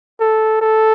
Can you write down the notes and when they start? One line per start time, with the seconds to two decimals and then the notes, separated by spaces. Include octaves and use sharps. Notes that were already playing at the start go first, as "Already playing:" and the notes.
0.20 A4
0.61 A4